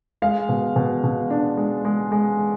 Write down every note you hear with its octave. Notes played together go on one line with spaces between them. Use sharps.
G#3 F5
B2
B2
B2
D4
G#3
G#3
G#3